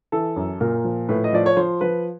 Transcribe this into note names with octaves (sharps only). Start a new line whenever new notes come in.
E3 A4
F#2
A#2 A#4
F3
A2 B4
D#5
F3 D5
C#5
F3 C5
F3 B4